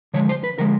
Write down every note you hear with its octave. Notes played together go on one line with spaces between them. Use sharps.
D3 F3 G#3 C#5
C5
B4
D3 F3 G#3 A#4